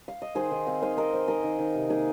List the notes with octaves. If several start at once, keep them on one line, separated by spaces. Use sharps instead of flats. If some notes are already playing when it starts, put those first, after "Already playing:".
F5
D#5
D#3 G#4 C5
D#3
C4 F5
D#3 C5 F5
C4 A#4 D#5
C4
D#3 A#4 D#5
D#3
D#3
C3
A#3 D#4 G#4